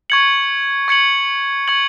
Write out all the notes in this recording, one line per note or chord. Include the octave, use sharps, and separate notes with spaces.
C#6 G#6 C#7 F#7
C#6 G#6 C#7 F#7
C#6 G#6 C#7 F#7